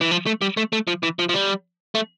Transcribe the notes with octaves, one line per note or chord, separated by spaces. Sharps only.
E3
F3
A3
G3
A3
A3
F3
E3
F3
F3
G3
A3